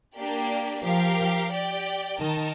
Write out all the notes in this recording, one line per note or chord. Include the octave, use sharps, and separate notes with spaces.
A#3 D4 G4 D5
F3 G4 A#4 F5
G4 D5 G5
D#3 D#4 A#4 D#5 A5